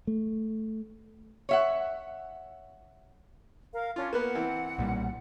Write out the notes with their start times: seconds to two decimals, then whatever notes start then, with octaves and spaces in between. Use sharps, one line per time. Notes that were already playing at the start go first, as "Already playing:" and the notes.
0.07 A3
1.49 C#5 E5 F#5
3.73 A#4 F5
3.96 C#4 D4 F4
4.13 A#3 B3 B4 F#5
4.35 E3 C4
4.78 B1 A#2 G3